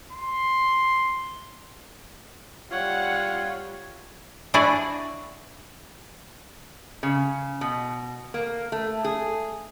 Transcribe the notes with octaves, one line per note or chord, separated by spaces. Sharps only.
C6
G3 F4 C#5 F#5
D4 E4 F#4 G#4 D5
C#3
B2
A#3
A3
G#4